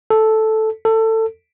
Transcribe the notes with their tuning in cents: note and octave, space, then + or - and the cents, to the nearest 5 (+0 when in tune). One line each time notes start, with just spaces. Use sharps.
A4 -5
A4 +20